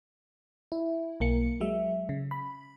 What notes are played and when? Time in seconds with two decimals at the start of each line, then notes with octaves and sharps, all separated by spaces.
0.72 E4
1.20 B1 A#3 C#7
1.60 F#3 G#3 E5
2.09 C#3
2.31 B5